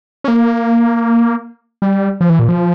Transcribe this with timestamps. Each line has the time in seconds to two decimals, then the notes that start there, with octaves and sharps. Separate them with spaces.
0.24 C#4
0.28 A#3
1.82 G3
2.21 F3
2.29 E3
2.39 A#2
2.49 F3